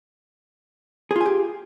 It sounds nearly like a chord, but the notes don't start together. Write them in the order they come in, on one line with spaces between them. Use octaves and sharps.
G#4 F4 G#5 G4